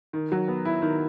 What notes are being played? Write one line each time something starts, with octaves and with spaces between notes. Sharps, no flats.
D#3
F#3
B3
E4
D#3